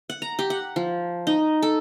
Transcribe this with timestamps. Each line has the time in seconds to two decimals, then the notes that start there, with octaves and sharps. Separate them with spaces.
0.10 F#5
0.22 A#5
0.39 G4
0.50 F#5
0.76 F3
1.27 D#4
1.63 A4